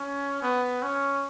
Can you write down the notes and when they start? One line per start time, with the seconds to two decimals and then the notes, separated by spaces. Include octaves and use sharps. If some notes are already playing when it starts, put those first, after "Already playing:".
Already playing: C#4
0.42 B3
0.82 C#4